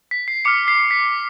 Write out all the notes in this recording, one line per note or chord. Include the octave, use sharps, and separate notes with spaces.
B6
C7
D6 F6 C#7
C7
B6